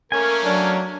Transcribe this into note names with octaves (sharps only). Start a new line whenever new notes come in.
A3 A#3 C#4 A#4 G#5
F#3 D4